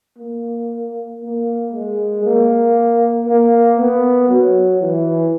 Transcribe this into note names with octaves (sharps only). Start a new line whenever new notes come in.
A#3
A#3
G#3
A#3
A#3
B3
F#3
E3